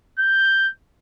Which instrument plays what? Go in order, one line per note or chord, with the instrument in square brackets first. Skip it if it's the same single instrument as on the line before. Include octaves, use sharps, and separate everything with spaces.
[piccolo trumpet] G6